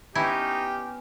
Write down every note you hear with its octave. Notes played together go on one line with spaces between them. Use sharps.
B3 C#4 D#4 E4 G4